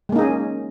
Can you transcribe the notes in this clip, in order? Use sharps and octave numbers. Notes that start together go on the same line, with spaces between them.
G#3 A#3 C#4 D#4 G#4